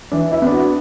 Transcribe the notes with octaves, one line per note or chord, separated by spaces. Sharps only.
E3 D4
E4
B3 D4
F#4